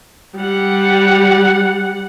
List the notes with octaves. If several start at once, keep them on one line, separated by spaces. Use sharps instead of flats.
G3 F#5